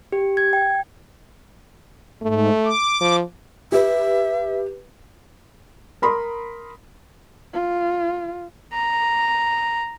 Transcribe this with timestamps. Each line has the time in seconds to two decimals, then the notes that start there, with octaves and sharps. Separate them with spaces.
0.12 G4
0.37 G#6
0.53 G5
2.22 G#2 A3
2.65 D6
3.01 F3
3.72 G4 B4 E5
6.02 A#4 B5 C6 D#6
7.53 F4
8.73 A#5